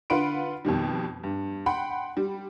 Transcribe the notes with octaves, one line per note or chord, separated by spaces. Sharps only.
D3 F4 B4 F#5 C6 D7
F2 B2 D#3 G3
G2
F#5 G5 B5 C6
G3